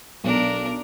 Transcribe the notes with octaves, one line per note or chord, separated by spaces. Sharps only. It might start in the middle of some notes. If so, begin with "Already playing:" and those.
B1 D4 A#4